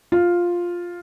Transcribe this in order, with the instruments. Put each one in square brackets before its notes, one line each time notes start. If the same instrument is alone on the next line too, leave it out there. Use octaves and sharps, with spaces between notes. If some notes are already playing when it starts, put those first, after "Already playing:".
[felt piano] F4